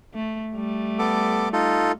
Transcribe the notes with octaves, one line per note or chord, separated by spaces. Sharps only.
A3
G3 A3
B3 A4 D6
D#4 F4 A4